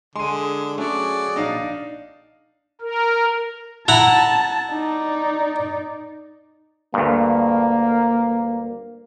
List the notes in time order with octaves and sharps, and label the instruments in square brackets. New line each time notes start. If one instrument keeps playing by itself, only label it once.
[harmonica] D3 [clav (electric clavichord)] G#3 [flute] G#4 [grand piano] C6 D#7
[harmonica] F#3 D5 [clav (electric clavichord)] A3 C#4 [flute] G#4
[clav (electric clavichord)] A#1 D#5 [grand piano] D4 D#4 F5
[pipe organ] A#4
[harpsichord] E4 F#5 A#5 [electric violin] A5
[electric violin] D#4 D5
[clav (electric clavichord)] D2 G2 [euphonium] A#3